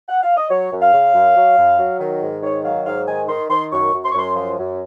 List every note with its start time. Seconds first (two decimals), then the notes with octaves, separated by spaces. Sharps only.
0.09 F#5
0.22 F5
0.37 D#5
0.50 F#3 C#5
0.71 F#2
0.82 F5
0.93 C#3
1.14 F#2
1.36 F#3
1.57 F#2
1.79 F#3
2.00 D#3
2.21 G#2
2.43 D#3 C#5
2.64 F#3 F5
2.86 G#2 F5
3.07 D#3 G#5
3.28 D#3 C6
3.50 D#3 C6
3.71 F#2 C#6
3.93 F#2
4.04 C6
4.11 C#6
4.15 F#2 C6
4.36 F3 C6
4.58 F#2